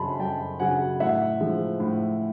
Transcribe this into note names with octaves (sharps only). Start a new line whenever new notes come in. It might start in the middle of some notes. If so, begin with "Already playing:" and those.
Already playing: F#2 C#3 F#3 A5 B5 C6
F#2 G5 A5
C#3 F#3 F#5 G#5
A2 E5 F#5
F3 G#3
A2